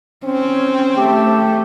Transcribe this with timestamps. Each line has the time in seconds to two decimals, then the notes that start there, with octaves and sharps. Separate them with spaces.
0.24 C4 C#4
0.98 A3 G4